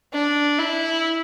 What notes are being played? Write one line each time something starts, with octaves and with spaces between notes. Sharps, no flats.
D4
E4